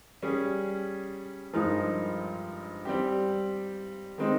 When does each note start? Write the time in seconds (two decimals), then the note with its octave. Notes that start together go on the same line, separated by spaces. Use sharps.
0.22 G3 C#4 G#4
1.53 G2 F3 G#3 D#4 A#4
2.85 G3 C4 G4
4.18 D#3 G#3 C4 D#4